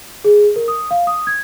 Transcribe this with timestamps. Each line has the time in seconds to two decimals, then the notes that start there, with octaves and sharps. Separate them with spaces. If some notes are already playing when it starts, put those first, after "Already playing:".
0.24 G#4
0.56 A#4
0.68 D#6
0.91 F5
1.07 D#6
1.27 G#6